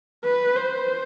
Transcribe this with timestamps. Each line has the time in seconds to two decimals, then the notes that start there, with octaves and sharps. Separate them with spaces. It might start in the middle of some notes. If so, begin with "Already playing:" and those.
0.25 B4
0.56 C5